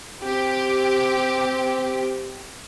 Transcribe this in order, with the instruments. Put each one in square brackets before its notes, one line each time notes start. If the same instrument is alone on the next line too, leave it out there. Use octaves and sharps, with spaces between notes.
[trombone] C4 [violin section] G4